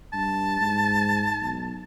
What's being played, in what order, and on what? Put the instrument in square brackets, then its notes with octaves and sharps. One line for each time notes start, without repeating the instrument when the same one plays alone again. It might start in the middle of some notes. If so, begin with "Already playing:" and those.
[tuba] G2 [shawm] A5
[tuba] G#2
B1